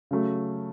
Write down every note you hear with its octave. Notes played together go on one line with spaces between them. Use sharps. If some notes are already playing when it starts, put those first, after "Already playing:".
C#3 F#3 A3